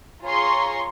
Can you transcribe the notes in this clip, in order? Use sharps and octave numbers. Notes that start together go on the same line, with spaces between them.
F4 G#4 C#5 A#5 C6 C#6